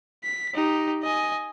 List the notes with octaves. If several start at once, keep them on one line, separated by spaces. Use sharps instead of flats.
B6
D#4 G4
D#5 G#5